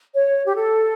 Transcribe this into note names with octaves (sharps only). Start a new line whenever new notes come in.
C#5
G4
A4